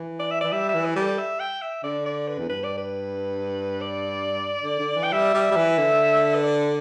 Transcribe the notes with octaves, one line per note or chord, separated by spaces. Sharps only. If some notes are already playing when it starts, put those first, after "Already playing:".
Already playing: E3
D5
E5
E3 D5
G3 E5
E5
E3
B4
G3
A4
E5
G5
E5
D3 D5
D5
B4
E2
G2 B4
D5
B4
D5
D3
D3
E3
G5
G3 E5
G3
G3
E3
D3
B4
D5